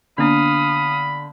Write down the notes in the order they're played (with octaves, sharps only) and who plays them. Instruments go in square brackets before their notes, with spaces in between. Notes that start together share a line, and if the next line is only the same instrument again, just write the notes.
[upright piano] D3 [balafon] A#3 B3 D4 [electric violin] F5 D#6 [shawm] B5